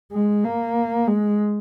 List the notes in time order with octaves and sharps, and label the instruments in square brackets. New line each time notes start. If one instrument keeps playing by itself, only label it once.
[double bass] G#3
A#3
G#3